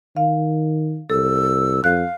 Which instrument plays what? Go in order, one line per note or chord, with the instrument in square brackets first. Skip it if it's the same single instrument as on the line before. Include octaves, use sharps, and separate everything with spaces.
[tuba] D#3 [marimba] F5
[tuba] C2 [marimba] A4 [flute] E6
[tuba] F2 [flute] F5 [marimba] F#6